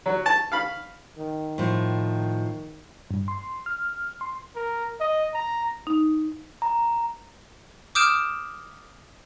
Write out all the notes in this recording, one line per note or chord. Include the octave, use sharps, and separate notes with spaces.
F#3
A5
F5 B5
D#3
A2 F3
G2
C6
F6
C6
A#4
D#5
A#5
D#4
A#5
D6 D#6 F6 G6 D7 E7